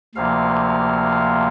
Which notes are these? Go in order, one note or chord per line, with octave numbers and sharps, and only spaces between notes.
D2 C3 F3 A#3 F5